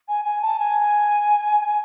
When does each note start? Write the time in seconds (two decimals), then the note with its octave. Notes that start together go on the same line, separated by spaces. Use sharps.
0.08 G#5
0.25 G#5
0.42 A5
0.59 G#5